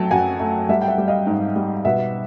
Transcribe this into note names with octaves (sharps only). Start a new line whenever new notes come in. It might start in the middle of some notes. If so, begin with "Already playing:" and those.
Already playing: F#3 A3 G5 A5
F#2 F#5 G#5
A3
G3 E5 F#5
G5
E5 F#5
G3
D#5 F5
G#2
G3
B2 E5 F#5